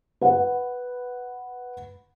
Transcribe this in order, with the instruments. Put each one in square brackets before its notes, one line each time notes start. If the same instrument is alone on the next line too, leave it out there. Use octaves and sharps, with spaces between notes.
[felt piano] B4 F#5